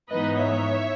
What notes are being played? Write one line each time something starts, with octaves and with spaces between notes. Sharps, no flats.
G#2 E3 B3 D#4 B4 D#5
C#5 E5